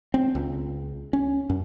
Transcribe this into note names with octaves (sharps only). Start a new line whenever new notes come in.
C4
C#2
C#4
F#2